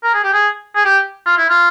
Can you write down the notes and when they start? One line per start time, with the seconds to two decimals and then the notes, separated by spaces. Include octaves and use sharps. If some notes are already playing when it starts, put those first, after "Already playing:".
0.03 A#4
0.14 G#4
0.24 G4
0.33 G#4
0.75 G#4
0.85 G4
1.26 F4
1.37 E4
1.49 F4